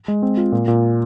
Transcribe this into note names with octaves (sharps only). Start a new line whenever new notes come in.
G#3
C4
F4
A#2
A#2